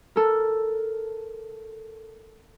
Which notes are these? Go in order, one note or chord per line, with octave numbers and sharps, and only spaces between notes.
A4 A#4